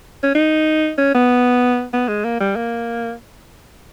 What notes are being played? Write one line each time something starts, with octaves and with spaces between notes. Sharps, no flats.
C#4
D#4
C#4
B3
B3
G#3
A#3
G3
A#3